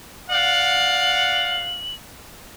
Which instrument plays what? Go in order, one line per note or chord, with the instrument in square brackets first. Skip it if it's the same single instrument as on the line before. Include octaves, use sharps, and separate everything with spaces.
[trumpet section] D5 F5 F#5 [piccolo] F#7